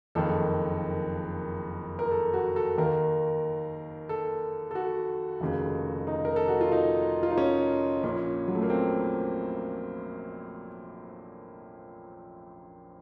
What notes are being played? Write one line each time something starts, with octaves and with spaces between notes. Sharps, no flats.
F#1 F2 D#3 A4
A#4
A4
F#4
A4
D#2 D#3 A#4
A4
A4
F#4
F1 D#2 C#3
D#4
A#4
A4
F#4
F4
D#4
F4
D#4
C#4
A#1 A#2 C#4
F#3
A3
A#3
C4